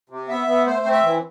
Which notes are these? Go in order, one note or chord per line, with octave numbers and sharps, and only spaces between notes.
C3
B3 E5
B3
A3 C5
C4
E5
E3